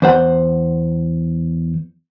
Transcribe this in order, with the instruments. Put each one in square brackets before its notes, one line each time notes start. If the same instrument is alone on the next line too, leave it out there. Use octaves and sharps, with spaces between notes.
[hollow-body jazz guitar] E2 C5 F#5